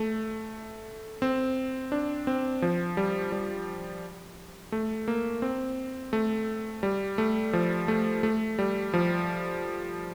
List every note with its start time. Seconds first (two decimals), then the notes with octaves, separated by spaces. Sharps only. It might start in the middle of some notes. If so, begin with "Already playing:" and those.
Already playing: A3
1.22 C4
1.92 D4
2.27 C4
2.62 F3
2.97 G3
3.32 G3
4.72 A3
5.08 A#3
5.42 C4
6.13 A3
6.83 G3
7.18 A3
7.53 F3
7.88 A3
8.23 A3
8.59 G3
8.94 F3